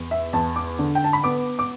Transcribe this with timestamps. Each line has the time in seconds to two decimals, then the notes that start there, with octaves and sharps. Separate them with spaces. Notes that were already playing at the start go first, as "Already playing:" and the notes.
Already playing: E2
0.11 E5
0.33 E2 A5
0.56 D6
0.79 D3
0.95 G5
1.04 A5
1.13 B5
1.24 B3 D6
1.59 D6